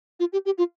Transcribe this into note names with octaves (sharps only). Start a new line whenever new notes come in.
F4
G4
G4
F4